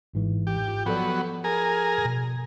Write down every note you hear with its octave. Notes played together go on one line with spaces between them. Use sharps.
G#1 G#2 E3
G4
F4
F3 F#3 B3 A4 D5
G#4 A#4
B2